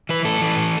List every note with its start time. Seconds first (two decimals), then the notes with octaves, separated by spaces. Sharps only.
0.09 E3 B4
0.25 A2 A4
0.41 E3
0.57 A2